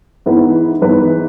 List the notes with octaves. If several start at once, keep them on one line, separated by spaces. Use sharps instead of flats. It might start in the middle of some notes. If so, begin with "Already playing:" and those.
G#2 E3 B3 E4 B4
G#2 E3 B3 E4 B4